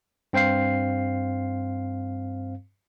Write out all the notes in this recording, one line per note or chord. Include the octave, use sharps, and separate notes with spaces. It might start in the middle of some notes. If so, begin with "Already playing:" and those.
G2 C4 C5 F5 C7